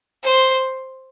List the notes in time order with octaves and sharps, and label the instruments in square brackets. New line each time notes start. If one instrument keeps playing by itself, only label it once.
[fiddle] C5